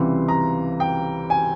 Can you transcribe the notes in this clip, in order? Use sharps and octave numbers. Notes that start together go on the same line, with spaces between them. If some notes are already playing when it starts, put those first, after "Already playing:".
Already playing: C#2 C3 E3 G3 C6
A#5
G5
G#5